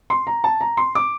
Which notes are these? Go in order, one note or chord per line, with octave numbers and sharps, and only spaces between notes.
C6
A#5
A5
A#5
C6
D6